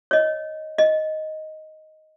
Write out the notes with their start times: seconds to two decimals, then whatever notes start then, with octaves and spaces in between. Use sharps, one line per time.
0.11 C#5 D#5
0.78 D#5